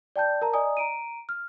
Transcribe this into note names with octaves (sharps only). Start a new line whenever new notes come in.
D5 G5 A5 G6
A#4 A5 A#5
D5 D#5 G#5 A#5 D#6
A#5 D7 D#7
F6